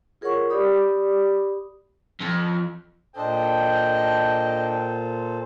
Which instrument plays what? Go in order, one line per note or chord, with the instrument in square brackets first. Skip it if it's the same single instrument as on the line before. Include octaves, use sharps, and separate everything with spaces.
[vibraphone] F4 G#4 A#4 C#5 F#5 C#6
G4 D5 B5 D6 D#6
[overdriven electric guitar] F2
[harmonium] A#2 A4 C5 [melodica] D4 [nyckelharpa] D#5 [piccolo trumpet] G5